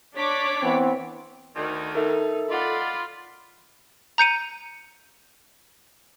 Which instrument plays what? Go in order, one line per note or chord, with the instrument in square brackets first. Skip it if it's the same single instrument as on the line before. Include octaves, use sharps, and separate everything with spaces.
[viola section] D4 C#5 [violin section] D6 B6
[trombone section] E3 B3 C4
[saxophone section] D2 D#3
[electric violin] D#4 [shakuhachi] A4 [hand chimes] A#4 E5
[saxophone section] F4 [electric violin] D5 B5 [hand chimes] D#5 F#5
[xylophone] A#5 G6 C#7 D#7